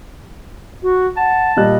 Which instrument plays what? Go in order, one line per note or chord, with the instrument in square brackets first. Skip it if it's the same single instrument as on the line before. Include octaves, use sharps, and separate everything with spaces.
[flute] F#4
[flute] F#5 [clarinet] A5
[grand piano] A#2 G3 F#6 [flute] D#5